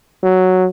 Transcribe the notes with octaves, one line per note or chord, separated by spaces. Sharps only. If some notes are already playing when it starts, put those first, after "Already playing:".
F#3